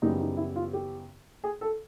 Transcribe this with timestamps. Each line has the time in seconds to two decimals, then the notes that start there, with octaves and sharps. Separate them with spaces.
0.02 F#2 C#3 E3 G3 B3 D#4
0.20 D#4
0.37 E4
0.56 F4
0.73 G4
1.44 G#4
1.61 A4